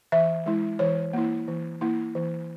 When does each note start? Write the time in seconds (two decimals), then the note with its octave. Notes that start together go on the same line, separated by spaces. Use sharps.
0.12 E3 E5
0.46 G#3 E4
0.79 E3 C#5
1.13 A#3 E4
1.48 E3
1.81 A#3 E4
2.15 E3